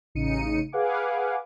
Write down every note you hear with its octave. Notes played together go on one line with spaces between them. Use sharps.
A1 C#3 D#4 C#7 D#7
G#4 B4 F5 F#5 G#5 D6